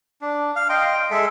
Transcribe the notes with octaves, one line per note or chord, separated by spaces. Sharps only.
D4
F5
D#5 G5 C6
G#3 A4 E5